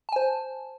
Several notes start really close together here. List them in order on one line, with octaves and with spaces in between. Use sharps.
A5 G#5 C5